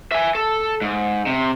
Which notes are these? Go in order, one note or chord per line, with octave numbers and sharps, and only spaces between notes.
E5 G#5
A4
G#2
C3